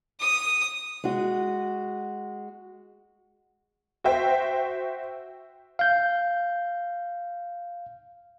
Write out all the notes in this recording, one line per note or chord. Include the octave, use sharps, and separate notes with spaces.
D#6
G#3 F#4
F#4 C5 E5 G5
F5 G6